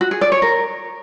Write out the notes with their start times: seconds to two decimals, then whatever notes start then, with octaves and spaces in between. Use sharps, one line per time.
0.01 F#4
0.11 G#4
0.21 D5
0.32 C#5
0.42 A#4